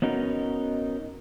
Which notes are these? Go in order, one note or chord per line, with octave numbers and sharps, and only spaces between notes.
B3 C#4 D#4 F#4 A#4